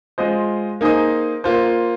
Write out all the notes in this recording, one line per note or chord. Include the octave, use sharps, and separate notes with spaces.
G#3 F4 C5 D#5
A#3 D#4 G#4 C5 D#5
A#3 F4 C5